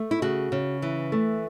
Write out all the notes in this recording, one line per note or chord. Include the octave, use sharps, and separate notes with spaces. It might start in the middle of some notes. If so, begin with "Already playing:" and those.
Already playing: A3
E4
C#3 F#4
C#3
E3
A3